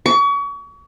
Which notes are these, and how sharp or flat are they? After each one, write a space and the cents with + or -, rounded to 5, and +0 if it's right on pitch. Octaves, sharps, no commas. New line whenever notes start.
C#6 +35